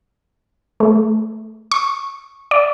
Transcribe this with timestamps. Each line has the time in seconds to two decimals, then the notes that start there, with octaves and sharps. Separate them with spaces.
0.80 A3
1.72 C#6
2.51 D5